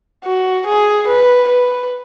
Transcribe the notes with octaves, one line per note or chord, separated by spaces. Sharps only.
F#4
G#4
B4
B4